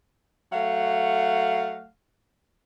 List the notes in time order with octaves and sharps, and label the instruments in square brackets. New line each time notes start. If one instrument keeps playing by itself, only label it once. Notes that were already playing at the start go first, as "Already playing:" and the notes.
[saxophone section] F#3 A3 F5 F#5